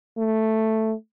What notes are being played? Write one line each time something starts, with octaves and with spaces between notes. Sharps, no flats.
A3